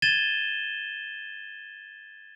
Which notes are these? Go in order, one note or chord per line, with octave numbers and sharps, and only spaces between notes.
G#6 A6 D#7 E7 G7